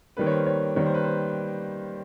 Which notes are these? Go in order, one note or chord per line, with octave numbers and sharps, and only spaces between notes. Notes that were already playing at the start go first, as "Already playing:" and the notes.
D#3 G3 A#3 B4
C#5
C5
C#5
D#3 G3 A#3 C#5
C5
B4
C5